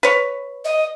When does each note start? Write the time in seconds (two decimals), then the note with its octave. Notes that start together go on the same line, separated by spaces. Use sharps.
0.03 B4 C#5
0.64 D#5